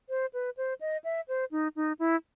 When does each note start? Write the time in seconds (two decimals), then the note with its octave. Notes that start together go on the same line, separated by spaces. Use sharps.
0.09 C5
0.33 B4
0.57 C5
0.81 D#5
1.04 E5
1.28 C5
1.52 D#4
1.76 D#4
1.99 E4